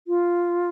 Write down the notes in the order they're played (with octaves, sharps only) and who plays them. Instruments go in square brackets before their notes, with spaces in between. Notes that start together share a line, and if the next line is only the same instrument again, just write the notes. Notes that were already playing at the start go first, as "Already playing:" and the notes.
[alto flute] F4